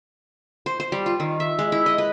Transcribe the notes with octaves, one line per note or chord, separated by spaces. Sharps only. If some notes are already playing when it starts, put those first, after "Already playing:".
C5
C5
G3
F4
D#3
E5
G#3
E4
D#5
B4